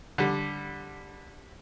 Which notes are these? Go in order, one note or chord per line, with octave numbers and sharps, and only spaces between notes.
D3 G3